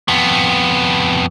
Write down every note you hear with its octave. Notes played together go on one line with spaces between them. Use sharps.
F2 B3